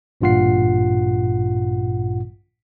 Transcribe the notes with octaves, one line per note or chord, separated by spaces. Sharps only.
A1 G2 A#2 F4 F#5 C7